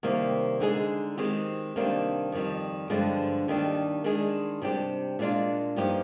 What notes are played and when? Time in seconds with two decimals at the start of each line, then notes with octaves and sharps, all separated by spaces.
0.03 C3 D#3 G3 A#3
0.60 D3 G#3 D#4 G#4
1.18 D#3 G#3 C4 G4
1.76 C3 D#3 G3 A#3 D4
2.32 F2 D#3 G3
2.90 G2 D3 F3 G#3 D4
3.48 D#2 D#3 G3 D4
4.04 D#3 G#3 D4 G#4
4.62 C3 G3 D4 G4
5.19 A#2 G#3 D4 F4
5.76 G2 F3 A#3 D#4 G4